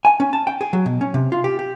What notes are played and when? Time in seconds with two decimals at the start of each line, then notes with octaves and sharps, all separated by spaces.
0.05 G#5
0.20 C#4
0.33 A5
0.47 G5
0.61 G#4
0.73 F#3
0.86 B2
1.01 C#4
1.14 C3
1.32 F4
1.44 G4
1.59 G4